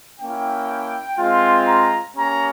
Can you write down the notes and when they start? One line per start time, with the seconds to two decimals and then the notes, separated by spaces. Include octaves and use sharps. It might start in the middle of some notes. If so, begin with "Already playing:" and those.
0.20 A#3 C#4 E4 G5
1.19 G#3 C4 F4
1.67 A#5
2.17 A#3 C#4 G4 A#5